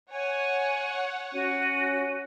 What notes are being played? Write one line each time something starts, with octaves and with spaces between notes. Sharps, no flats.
C#5 F#5 G#5
C#4 F#4 D#7